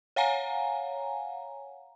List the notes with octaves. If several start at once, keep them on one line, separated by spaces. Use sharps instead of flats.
C#5 F5 F#5 G#5 A#5